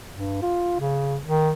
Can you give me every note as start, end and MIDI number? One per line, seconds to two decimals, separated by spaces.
0.13 0.37 43
0.42 0.80 65
0.80 1.17 49
1.23 1.52 51